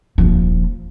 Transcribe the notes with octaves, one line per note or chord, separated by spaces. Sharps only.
D#1 F3